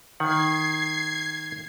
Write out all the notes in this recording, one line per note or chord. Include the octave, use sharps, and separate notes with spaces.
D#3 F#5 G#6 C7